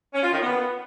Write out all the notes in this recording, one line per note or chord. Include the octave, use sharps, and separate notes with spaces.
C#4
F4
D#3
B3